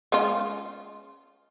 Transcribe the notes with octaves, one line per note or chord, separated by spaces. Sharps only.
G#3 C#4 F4